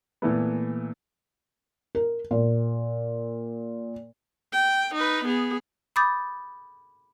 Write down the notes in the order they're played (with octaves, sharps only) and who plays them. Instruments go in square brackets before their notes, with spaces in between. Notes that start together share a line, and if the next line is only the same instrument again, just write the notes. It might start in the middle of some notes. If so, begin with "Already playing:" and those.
[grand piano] A#2 E3 A3 B3
[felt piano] A#4
A#2
[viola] G5
D#4 B4
B3 G#4
[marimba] B5 D6 D#6 G6 A6